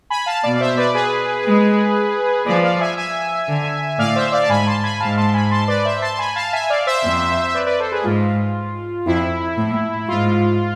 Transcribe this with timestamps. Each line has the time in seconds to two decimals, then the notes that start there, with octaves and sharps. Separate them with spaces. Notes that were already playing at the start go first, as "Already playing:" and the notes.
0.10 G#5 B5
0.26 F5 A5
0.43 B2 D5 F5
0.55 D5
0.61 C5 E5
0.77 B4 D5
0.94 G#4 B4
1.45 G#3
2.46 F3 B4 D5
2.63 D5 F5
2.80 E5 G#5
2.97 E5 G#5
3.48 D3
3.99 A2 D5 F5
4.16 C5 E5
4.32 D5 F5
4.43 A5
4.49 G#2 G#5 B5
4.66 A5 C6
4.83 G#5 B5
5.00 G#2 F5 A5
5.17 A5 C6
5.34 G#5 B5
5.51 A5 C6
5.68 B4 D5
5.85 C5 E5
6.02 A5 C6
6.14 A5
6.19 G#5 B5
6.36 F5 A5
6.53 E5 G#5
6.70 D5 F5
6.87 C5 E5
7.03 F2
7.55 B4 D5
7.66 B4 D5
7.80 A4 C5
7.92 G#4 B4
8.04 G#2 F4
9.06 F2 E4
9.57 A2
10.08 G#2 F4